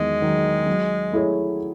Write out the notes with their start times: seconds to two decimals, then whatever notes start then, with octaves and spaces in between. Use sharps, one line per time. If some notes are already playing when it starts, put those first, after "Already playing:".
Already playing: E2 D#3 F#3 G#3
0.22 D#3 F#3
0.67 F#3
1.12 A3 E4 G#4 C#5